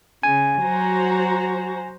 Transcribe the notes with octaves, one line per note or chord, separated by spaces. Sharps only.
C#3 G#5
F#3 F#4 C5 A#5